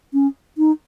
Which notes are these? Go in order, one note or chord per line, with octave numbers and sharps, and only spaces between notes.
C#4
D#4